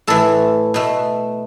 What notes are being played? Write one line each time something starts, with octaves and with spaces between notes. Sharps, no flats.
A2 E3 A3 A4
B2 A3